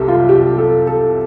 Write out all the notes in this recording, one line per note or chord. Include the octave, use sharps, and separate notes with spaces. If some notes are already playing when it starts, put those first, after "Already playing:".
Already playing: C2 C3 G4 A4
F4
G4
A4
A4